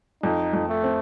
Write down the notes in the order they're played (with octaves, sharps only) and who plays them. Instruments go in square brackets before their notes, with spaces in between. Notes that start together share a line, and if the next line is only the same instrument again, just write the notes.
[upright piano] F2 [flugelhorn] D#4
[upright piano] F2
[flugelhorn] A3
[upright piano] C4